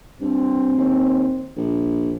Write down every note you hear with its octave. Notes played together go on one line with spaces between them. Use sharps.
G2 C4
D#2
A#1